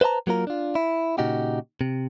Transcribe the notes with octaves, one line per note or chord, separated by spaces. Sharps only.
B4 C5 D#5 A5 A#5
F#3 A#3 F4 A#4
D4 F4
E4
A#2 C#3 D#4 F#4 G4
C3